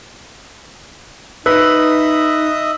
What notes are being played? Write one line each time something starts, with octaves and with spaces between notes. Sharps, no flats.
D#4 B4 D#5 E5 D#6 E6